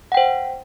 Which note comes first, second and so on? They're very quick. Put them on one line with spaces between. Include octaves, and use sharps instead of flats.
F#5 G5 C5